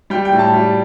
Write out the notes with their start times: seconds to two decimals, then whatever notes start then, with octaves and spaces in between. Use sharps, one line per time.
0.10 G3 G5
0.25 G5
0.32 A2
0.39 A5
0.53 G3